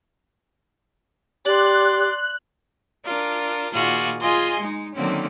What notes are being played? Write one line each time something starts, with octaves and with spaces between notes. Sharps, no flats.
G4 D5 C6 F#6
D4 F4 A#4
A#2 D#3 A#3 F4 F#4 G#4
F4 G#4 D#5 G#5 C6
G#3 D#4
D3 D#3 F#3 A#3 C4 C#4